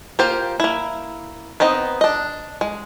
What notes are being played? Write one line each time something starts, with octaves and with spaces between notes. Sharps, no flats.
A#3 F4 G4 C5
A#3 E4
B3 C4 D#4 D#5
D4 D#5
G#3